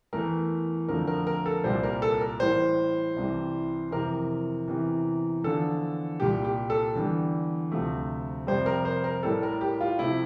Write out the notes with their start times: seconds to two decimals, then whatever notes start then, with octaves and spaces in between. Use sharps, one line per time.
0.13 E2 E3 A3 A#4
0.88 F2 D3 F3 A3 A#4
1.07 A#4
1.27 A#4
1.46 A4
1.64 C2 A#2 G3 C5
1.83 A#4
2.02 A4
2.21 A#4
2.40 A2 E3 G3 C5
3.16 C2 C3 E3 G3
3.91 F2 C3 E3 A#4
4.68 E2 C3 E3
5.44 E2 D3 F3 A4
6.20 C2 A#2 G3 G4
6.44 G4
6.70 A4
6.95 E2 D3 G3
7.72 D2 C3 F3 A3
8.47 F2 C3 G3 C5
8.66 A#4
8.85 C5
9.04 A#4
9.23 A2 G3 A4
9.43 A#4
9.61 G4
9.80 F4
9.99 C3 F3 A3 E4